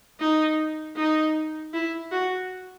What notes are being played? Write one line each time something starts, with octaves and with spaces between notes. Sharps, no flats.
D#4
D#4
E4
F#4